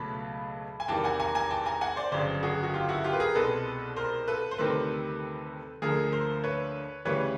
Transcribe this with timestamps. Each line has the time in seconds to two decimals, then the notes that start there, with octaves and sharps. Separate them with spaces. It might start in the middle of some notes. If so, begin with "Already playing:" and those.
Already playing: C#2 B2 F#3 A3 A5 B5
0.80 G#5
0.88 E2 C3 D#3 G3 A#3 G5 A5
1.04 F#5 G#5
1.20 G#5 A#5
1.35 G#5 A#5
1.50 G5 A5
1.66 G#5 A#5
1.81 F#5 G#5
1.96 C5 D5
2.12 G1 F2 C#3 F#3 C5 D5
2.43 F#4 G#4
2.63 F#4
2.74 F4 G4
2.89 E4 F#4
3.04 F4 G4
3.13 B4
3.20 G#4 A#4
3.35 C2 B2 G#3 C4 A4 B4
3.96 A#4 C5
4.28 A4 B4
4.51 C5
4.58 D2 C3 D#3 G3 C4 A4 B4
5.82 D2 D3 F3 A#3 G#4 A#4
6.12 A#4 C5
6.44 B4 C#5
7.05 D2 C#3 E3 G3 B4 C#5